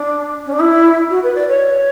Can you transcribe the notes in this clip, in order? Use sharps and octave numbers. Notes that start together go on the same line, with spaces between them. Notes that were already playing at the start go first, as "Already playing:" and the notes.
Already playing: D4
C#4
D4
E4
F#4
B4
D5
C#5